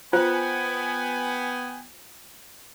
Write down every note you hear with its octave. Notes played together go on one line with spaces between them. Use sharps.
B3 F4 C5 G5 G#5